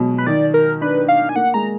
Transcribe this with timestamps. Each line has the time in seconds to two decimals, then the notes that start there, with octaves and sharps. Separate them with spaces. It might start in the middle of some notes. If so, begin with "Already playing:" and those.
Already playing: B2 F#3 G#3
0.18 B4
0.27 D#3 D5
0.54 A#4
0.81 D4 B4
1.08 F5
1.29 G#5
1.36 A#3 F#5
1.54 G#3 A#5